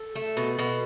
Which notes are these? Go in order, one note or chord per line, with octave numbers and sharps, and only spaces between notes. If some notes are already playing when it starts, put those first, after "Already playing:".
Already playing: A4
A3
B2
B2